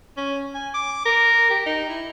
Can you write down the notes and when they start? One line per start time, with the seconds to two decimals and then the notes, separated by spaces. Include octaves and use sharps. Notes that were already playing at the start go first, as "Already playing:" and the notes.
0.17 C#4
0.54 G#5
0.74 D6
1.06 A#4
1.50 G4
1.66 D#4
1.89 E4